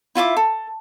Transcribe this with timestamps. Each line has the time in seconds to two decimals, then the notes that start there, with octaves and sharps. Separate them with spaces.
0.15 E4 F4 E5 D6
0.37 A4